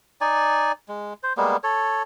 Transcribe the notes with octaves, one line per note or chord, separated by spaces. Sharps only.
D#4 D5 G#5
G#3
C5
G3 G#3 A#3 B3
A4 C#5